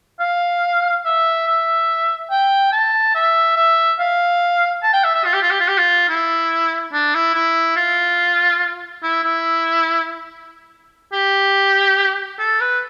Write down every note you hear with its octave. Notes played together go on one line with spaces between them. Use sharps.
F5
E5
E5
G5
A5
E5
E5
F5
A5
G5
E5
E5
F4
G4
F4
G4
F4
G4
F4
E4
D4
E4
E4
F4
E4
E4
G4
A4
B4